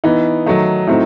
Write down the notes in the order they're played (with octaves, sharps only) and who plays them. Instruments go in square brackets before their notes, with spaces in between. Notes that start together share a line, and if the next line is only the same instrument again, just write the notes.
[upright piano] E3 B3 D#4
D#3 F#3 A3 D#4
A2 F#3 A3 C4 D#4